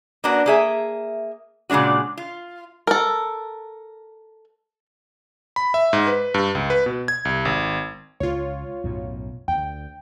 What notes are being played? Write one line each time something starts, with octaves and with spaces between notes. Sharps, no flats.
A#3 B3 C#4 D4 F#4
A#3 G#4 E5
A#2 C#3 G#3 D4 F#4
F4
A4 A#4
B5
E5
G#2
B4
G2
C#2
B4
B2
G#6
C2
G#1
C#2 F4 C#5
B1 F#2 A2
D2 G5